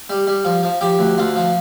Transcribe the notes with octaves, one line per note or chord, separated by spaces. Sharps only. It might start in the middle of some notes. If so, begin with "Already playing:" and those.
G3
G3
F3
F3
F3 G4
D2
D2 F4
F3